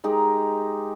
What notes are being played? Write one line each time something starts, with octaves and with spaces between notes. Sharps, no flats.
G#3 D#4 G4 A#4